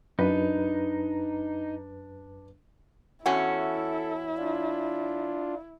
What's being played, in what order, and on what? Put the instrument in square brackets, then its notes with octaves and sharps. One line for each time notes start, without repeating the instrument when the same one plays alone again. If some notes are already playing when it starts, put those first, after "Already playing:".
[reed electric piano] F#2 B4 [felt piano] D4 [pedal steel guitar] D#4
[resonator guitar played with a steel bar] E2 C#4 F#4 [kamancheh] E4 [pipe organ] A4
[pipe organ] D4 F4